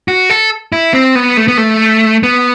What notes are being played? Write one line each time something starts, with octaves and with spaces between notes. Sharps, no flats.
F#4
A4
E4
C4
B3
A3
B3
A3
B3